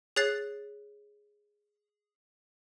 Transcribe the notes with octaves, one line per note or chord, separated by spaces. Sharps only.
G#4 C#5 F#6 A6 C7